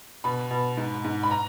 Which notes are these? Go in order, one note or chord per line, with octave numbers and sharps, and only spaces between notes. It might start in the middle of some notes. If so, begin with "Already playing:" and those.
B2 B5
B2
G#2
G#2
B5
A#5